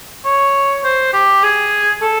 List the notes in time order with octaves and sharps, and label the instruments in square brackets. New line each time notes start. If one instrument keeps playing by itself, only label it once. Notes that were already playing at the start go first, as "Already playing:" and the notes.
[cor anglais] C#5
C5
G4
G#4
A4